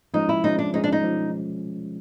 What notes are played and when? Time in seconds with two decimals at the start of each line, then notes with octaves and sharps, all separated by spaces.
0.14 F3 G#3 C#4 D#4
0.29 E4
0.44 F3 G#3 C#4 D#4
0.59 D4
0.73 F3 G#3 C#4 D#4
0.84 D4
0.92 D#4
1.04 F3 G#3 C#4